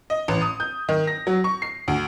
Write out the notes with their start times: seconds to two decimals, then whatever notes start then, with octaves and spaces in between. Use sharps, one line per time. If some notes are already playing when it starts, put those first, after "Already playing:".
0.10 D#5
0.28 A1
0.41 D#6
0.60 G6
0.89 D#3
1.07 A#6
1.27 F#3
1.44 C#6
1.62 C7
1.88 D2